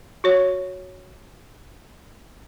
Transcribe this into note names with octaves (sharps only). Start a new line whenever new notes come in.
F#4 C#5